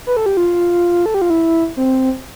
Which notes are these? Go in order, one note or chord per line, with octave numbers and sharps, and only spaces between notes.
B4
A4
G4
F4
A4
G4
F4
E4
C4